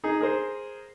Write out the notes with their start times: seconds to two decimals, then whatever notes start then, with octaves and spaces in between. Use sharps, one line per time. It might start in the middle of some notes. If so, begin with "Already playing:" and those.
0.04 D#4 G#4
0.21 G#4 A#4 C5